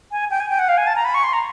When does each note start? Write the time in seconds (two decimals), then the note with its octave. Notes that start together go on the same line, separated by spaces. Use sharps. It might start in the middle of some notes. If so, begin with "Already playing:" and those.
0.12 G#5
0.31 G5
0.40 G#5
0.50 G5
0.59 F#5
0.69 F5
0.77 G#5
0.87 A5
0.96 A#5
1.05 B5
1.14 C#6
1.24 C6
1.33 A#5